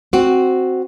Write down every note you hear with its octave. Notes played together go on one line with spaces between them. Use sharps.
C4 F#4